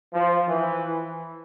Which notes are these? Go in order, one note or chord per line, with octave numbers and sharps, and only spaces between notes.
F3
E3